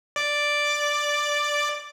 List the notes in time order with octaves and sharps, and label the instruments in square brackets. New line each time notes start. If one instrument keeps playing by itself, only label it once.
[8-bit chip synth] D5 D6